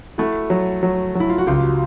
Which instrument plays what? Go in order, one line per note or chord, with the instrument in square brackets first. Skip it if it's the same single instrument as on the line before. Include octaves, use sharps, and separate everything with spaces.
[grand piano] A3 [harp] E4 F#4
[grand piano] F#3
F#3
[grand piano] F#3 [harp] E4
[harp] F4
F#4
[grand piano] C#2 [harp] F4 G4